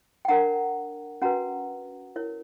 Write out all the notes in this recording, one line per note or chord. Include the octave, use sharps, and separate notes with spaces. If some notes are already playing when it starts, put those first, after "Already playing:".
G5
D4 A#4 C#5 F#5 A#5
C#4 F#4 B4 F#5 A#5
E4 A#4 C#5